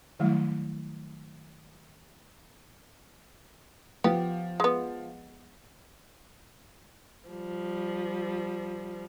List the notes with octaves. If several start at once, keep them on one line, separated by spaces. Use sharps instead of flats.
D#3 F#3 G3 A3 E4
F3 B3 G4
G#3 B3
F3 G3